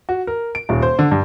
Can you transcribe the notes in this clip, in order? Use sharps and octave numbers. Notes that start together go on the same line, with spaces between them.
F#4
A#4
D7
D#1
C5
D3
G2